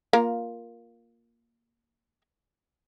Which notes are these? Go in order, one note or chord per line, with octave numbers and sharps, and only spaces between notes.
A#3 F4 A#4